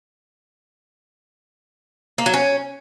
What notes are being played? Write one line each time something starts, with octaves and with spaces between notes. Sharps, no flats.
A#3
F#3
C#4